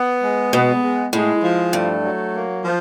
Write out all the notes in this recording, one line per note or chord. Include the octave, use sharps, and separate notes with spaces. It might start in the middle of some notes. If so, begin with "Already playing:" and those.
Already playing: B3
G#3
B2 B3
G#3
A2 G#3
F3
G2 A3
F#3
A#3
F3